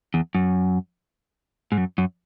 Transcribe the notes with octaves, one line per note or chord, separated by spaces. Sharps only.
E2
F#2
G#2
F#2
F#2